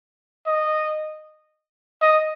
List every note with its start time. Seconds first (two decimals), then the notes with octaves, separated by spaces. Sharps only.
0.47 D#5
2.02 D#5